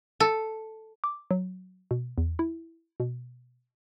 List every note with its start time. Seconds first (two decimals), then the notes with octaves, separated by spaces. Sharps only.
0.20 A4
1.04 D6
1.31 F#3
1.91 B2
2.18 E2
2.39 E4
3.00 B2